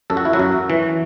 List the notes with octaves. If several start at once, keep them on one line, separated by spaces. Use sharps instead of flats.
F#2 A4
F#4
E4
F#3 F#4
F#2
E3